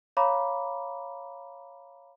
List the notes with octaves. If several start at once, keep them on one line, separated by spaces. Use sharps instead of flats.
C#5 F5 A#5 B5 D6